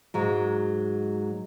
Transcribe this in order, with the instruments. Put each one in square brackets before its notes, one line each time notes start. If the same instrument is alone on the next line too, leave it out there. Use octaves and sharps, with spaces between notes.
[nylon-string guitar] G#2 F#3 G#3